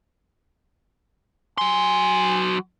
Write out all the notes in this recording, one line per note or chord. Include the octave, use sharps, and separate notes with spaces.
F#3 G#5 C6